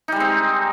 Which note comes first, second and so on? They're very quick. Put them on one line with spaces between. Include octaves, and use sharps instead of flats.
D#4 G3 G#3 C4